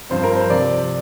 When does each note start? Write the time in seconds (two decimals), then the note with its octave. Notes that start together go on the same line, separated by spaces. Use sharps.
0.10 G2 F3 C4 C5
0.23 A#4
0.36 C5
0.50 C3 F3 C4 D5